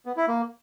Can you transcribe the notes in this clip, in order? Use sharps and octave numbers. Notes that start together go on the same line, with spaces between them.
B3
E4
A#3